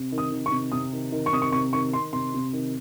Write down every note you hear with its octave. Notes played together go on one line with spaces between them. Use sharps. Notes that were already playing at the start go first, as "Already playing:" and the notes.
Already playing: C3
D#3
D#6
D#3
C#6
C3
C3 D#6
D#3
D#3
C#6
C3 D#6
C#6
C3 C#6
D#3 C#6
D#3 C6
C3 C6
C3
D#3